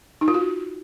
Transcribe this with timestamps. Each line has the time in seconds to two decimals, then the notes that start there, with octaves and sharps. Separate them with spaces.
0.21 D#4
0.28 F4
0.34 F#4